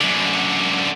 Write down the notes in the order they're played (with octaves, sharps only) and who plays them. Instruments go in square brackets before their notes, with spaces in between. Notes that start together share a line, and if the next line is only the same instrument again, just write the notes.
[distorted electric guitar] F#2 D3